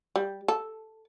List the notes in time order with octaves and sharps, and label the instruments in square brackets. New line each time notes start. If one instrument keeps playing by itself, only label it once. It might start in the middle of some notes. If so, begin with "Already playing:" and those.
[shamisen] G3
A4